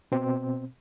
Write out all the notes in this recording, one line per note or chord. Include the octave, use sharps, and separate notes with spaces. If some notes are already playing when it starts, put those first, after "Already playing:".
B2 C4